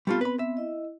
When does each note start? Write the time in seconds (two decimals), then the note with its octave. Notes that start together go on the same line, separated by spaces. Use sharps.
0.07 G3 A3 B3 C4 F4
0.21 B4 B5
0.39 E5
0.57 E4 D#5